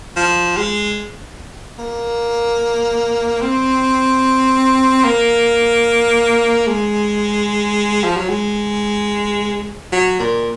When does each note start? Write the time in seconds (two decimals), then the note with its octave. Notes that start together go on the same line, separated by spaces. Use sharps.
0.17 F3
0.57 G#3
1.79 A#3
3.42 C4
5.05 A#3
6.67 G#3
8.04 F3
8.17 F#3
8.29 G#3
9.93 F#3
10.19 A#2